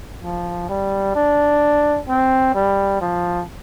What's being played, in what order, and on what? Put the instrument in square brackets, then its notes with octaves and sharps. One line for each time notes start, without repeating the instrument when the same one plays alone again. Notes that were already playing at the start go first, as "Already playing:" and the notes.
[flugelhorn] F3
G3
D4
C4
G3
F3